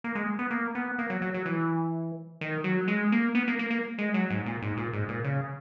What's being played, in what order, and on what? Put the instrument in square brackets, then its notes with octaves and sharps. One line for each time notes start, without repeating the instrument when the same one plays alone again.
[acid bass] A#3
G#3
B3
A#3
B3
A#3
F#3
F#3
F#3
E3
D#3
F#3
G#3
A#3
B3
A#3
A#3
A#3
G#3
F#3
G#2
A#2
G#2
A#2
G#2
A#2
C#3